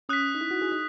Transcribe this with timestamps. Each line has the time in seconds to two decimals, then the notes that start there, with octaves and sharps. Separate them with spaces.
0.09 C#4 D#6 F#6 B6
0.35 D#4
0.41 E4
0.51 F#4
0.62 G#4
0.72 D#4